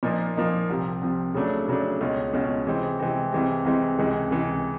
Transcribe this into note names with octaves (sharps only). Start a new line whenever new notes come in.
A#2 F3 A#3 D#4
A#2 F3 A#3 D#4
C2 C3 F3
C2 C3 F3
C#3 F#3 A3 D4
C#3 F#3 A3 D4
C#2 B2 G#3 C#4 F4
C#2 B2 G#3 C#4 F4
C3 E3 G#3 C4
C3 E3 G#3 C4
C2 C3 E3 G#3 C4
C2 C3 E3 G#3 C4
C#2 C3 E3 G#3
C#2 C3 E3 G#3